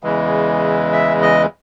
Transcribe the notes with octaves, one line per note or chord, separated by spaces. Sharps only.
E2 C#3 E3 G#3
E5
D#5